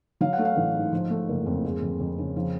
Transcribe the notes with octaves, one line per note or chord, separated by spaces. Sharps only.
F#3 F5
F#5
A3
F5
A1
G#2
F3
A3
F#1
F2
G#3
F2
F2
C#3
F3